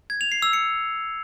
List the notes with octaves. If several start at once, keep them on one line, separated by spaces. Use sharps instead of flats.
G#6
F7
C7
E6
C#7